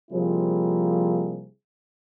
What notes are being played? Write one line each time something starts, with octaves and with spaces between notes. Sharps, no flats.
C3 F3 G3 A#3 E4 G#4